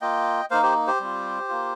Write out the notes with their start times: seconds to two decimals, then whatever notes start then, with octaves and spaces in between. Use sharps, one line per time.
0.01 A#3 F4 D#5 G5
0.51 A#3 D#4 C5 F5
0.63 G4 C5
0.87 G4 C5
1.00 G3 C4 F4
1.49 A#3 F4